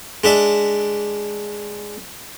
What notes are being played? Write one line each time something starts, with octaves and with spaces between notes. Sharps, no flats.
G#3 D4 E5